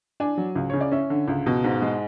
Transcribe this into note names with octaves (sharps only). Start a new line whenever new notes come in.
D4 G#5
F#3
C#2
C#3 C#5
D5
C#4 E5
D3
C#2
B2
G#2
G#3